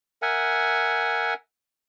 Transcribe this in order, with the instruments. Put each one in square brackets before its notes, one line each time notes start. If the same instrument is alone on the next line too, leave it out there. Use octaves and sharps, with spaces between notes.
[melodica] A#4 E5 F#5 G#5